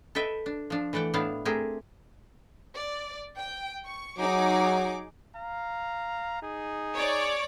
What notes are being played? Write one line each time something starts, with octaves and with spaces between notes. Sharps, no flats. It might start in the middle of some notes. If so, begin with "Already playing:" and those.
A4 B4 D#5 E5 G5
D4
F3 D4
E3 A3 D5 F#5 G5
A2 A3 B3 D4 E4 F5
A3 C4 G4 G#4 A#4
D5
G5
C#6
F#3 D#4 G#4 D6
F5 A#5
D#4 G#4
C#5 D5